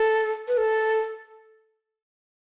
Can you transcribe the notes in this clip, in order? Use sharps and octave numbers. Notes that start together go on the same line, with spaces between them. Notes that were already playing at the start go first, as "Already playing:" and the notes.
Already playing: A4
B4
A4